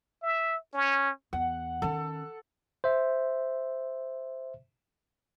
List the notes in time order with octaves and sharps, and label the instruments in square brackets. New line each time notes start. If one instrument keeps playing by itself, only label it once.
[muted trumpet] E5
C#4
[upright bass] E2 [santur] F#5
[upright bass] D#3 C#4 [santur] A4
[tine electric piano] C5 E5